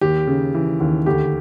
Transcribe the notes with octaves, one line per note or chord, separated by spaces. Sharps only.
D#2 G4
C#3
E3
D#2
D2 G4